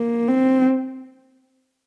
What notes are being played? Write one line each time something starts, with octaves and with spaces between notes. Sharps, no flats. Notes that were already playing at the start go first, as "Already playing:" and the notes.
Already playing: A#3
C4